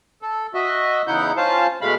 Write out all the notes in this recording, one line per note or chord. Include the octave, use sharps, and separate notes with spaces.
A4
F#4 D#5 E5
E2 C#3 D#4 E4 F#5 G6
C#4 F4 C5 F5 A5
B2 G#3 A3 F5 B5